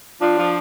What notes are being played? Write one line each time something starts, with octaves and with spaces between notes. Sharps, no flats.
F3 D4
F3